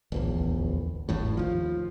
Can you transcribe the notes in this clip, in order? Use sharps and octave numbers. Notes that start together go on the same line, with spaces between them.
D1 A#1 E2
G#1 D#2 A2
D#2 F3